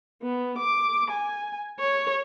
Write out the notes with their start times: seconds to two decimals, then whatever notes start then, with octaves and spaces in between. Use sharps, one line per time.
0.22 B3
0.58 D6
1.10 G#5
1.80 C#5